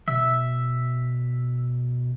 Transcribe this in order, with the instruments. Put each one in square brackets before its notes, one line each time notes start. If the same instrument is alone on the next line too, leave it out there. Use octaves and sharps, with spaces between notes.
[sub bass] B2 [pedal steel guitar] E5